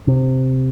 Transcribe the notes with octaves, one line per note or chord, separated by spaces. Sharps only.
C3